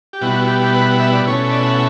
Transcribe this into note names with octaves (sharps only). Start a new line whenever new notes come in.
G4
B2 G3 B3 E4 F#4
F#4
G4
G4
B4
F#5
E5
D5
B2 A3 C#4 E4 C#5
D5
F#5